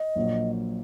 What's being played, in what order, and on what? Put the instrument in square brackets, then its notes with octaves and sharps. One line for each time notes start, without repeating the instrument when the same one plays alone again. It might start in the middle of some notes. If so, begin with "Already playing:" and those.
Already playing: [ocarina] D#5
[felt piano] A#1 A#2 F#3